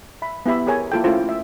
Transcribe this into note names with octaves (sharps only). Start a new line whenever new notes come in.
E5 B5
B3 E4 G4 E5 B5
G4 G#4 A#4 C#5 G#5
A#3 E4 F4 A4 G5
A3 C#4 E4 F4 C5
E5